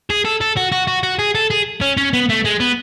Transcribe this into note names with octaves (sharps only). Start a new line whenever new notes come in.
G#4
A4
A4
F#4
F#4
F#4
F#4
G#4
A4
G#4
C#4
C#4
B3
A3
G#3
B3